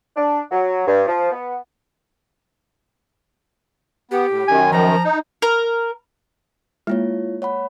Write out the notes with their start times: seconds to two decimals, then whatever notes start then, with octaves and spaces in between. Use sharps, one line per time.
0.17 D4
0.50 F#3
0.86 G2
1.06 F3
1.31 B3
4.11 B3 G4
4.30 A2
4.48 F#2 D#3 G#5
4.72 F3 A#5
5.04 D#4
5.42 A#4
6.87 G#3 A#3 E4 F4 C#5
7.42 C#5 F#5 B5